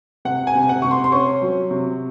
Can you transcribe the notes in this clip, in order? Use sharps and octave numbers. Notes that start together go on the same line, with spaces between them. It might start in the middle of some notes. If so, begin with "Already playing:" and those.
C3 F#5
G#5
C3
F#5
C3 C#6
C6
C6
C#4 C#6
F#3
C3